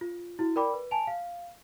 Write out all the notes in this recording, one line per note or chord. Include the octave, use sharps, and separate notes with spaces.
F4
E4 F#4
A#4 D5 G5 B5 D6
B4
G#5 A5 D7 F7
F5